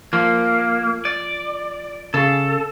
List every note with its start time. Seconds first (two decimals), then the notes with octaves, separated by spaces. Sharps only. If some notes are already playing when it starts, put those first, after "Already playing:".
0.13 F3 A#3
1.05 D5
2.14 C#3 G#4 A4